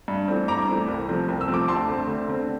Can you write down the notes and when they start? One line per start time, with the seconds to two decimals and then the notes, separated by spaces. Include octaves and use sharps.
0.08 G2
0.28 E3 A3 C4
0.48 G2 A#5 D6
0.67 E3 A3 C4
0.88 C2
1.09 C3 F3 A3 C4
1.28 C2
1.41 E6
1.48 C3 F3 A3 C4
1.54 D6
1.68 D2 A5 C6
1.88 D3 A3 C4
2.07 D2
2.28 D3 A3 C4